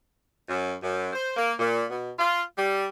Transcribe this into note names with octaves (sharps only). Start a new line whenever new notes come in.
F#2
F#2
C5
A#3
A#2
B2
F4
G3